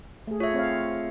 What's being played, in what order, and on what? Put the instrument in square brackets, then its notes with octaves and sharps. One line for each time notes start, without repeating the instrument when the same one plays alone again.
[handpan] A3 G#4
[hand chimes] F4 E5 [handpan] C#5
[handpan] C4 C#5 F5